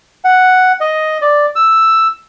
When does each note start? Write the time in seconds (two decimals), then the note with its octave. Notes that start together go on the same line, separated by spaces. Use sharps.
0.24 F#5
0.80 D#5
1.22 D5
1.56 E6